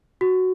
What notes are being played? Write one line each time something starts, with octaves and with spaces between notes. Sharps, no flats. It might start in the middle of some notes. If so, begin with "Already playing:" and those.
F#4